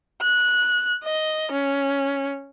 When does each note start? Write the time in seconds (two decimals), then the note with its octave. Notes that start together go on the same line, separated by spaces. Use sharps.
0.22 F#6
1.04 D#5
1.52 C#4